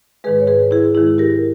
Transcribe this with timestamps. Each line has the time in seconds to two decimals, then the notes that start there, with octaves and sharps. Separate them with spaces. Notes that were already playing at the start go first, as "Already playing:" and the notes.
0.24 G#2 D#3 G#3 G#4 B4
0.40 C#5
0.47 G#4 B4
0.71 E4 G#4
0.95 G#2 D#3 G#3 E4 G#4
1.18 G4 A#4